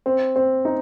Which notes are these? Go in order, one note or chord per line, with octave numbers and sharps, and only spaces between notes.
C4
C4
D#4